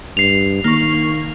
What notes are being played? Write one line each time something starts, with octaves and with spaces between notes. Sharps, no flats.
G2 C7 F7
D#3 A#3 C#6